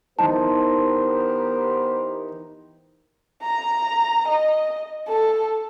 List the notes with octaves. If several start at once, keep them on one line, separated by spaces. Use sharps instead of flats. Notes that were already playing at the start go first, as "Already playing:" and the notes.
E3 B3 D#4 G4 A#4 C5 A5
A#5
D#5
A4